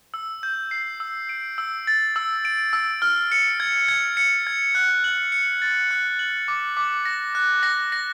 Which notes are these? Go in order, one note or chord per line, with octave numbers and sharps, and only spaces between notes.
E6
G6
C7
E6
D7
E6
A6
E6
D7
E6
F6
C#7
G#6
G#6
C#7
G#6
F#6
F#7
C#7
A6
F#6
F#7
D6
D6
A#6
F#6
A#6
A#6